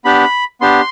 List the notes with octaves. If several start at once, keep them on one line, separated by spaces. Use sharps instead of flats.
B3 D4 G4 B5
B3 D4 G4 C6